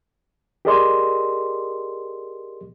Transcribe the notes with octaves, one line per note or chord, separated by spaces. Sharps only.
G4 G#4 A#4 D5 D#5 C6